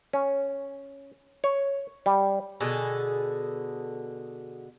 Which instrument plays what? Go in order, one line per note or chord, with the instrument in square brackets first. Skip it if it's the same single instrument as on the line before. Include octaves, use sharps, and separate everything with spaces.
[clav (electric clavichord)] C#4
C#5
G3
[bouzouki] B2 D3 G#4 A4